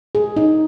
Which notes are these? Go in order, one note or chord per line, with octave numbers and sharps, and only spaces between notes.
G#4
D#4